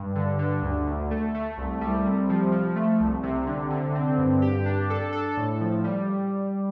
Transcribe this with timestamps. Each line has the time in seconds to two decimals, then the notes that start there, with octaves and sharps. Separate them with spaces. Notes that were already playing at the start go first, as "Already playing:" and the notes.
Already playing: G2
0.15 D3
0.39 D3
0.62 D2
0.87 D2
1.11 A3
1.35 A3
1.58 C2
1.81 G3
2.06 C3
2.29 F3
2.52 F3
2.76 A3
3.00 C2
3.23 C3
3.47 D3
3.70 D3
3.95 C4
4.18 G2
4.42 G4
4.66 D4
4.90 A4
5.13 A4
5.37 A2
5.61 F3
5.84 G3